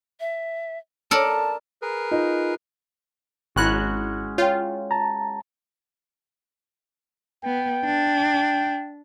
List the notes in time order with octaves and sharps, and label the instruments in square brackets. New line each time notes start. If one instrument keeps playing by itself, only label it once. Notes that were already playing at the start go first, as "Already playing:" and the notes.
[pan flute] E5
[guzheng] A4 A#4 D5 [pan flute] A5
[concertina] G#4 A#4 B4
[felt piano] D#4 [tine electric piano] F4
[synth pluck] G#1 F#6 [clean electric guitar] G#3 C#4 F#4 [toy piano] E4 B5 C#6
[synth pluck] F4 [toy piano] C#5 G5
[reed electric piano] A5 A#5
[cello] B3 [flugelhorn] G5
[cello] D4